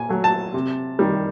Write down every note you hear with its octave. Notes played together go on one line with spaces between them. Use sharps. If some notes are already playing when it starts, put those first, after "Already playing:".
Already playing: A#2 G#5
F#3 A3
A5
C3
D#3 G3